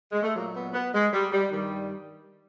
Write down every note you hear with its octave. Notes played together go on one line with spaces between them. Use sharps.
G#3
A3
A#2 F#3 A#3
B3
B3
G#3
G3
G3
G2 D#3 G3